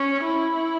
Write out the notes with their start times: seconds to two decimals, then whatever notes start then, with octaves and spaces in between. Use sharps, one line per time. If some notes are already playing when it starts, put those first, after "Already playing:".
Already playing: C#4
0.25 E4